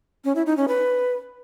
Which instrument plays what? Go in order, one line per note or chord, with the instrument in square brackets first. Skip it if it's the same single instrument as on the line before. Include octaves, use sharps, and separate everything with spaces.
[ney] C#4
E4
D#4
C#4
B4